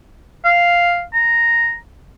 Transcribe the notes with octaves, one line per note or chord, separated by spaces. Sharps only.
F5
A#5